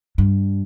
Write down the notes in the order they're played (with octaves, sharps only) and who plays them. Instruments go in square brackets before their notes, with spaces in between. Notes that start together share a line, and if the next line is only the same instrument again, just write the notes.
[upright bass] G2